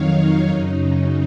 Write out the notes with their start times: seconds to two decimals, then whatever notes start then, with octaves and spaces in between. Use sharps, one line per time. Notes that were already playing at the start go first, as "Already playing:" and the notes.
Already playing: F2 D#3 F#3 D#4 C#5 F5
0.48 F#2 C#3 F#3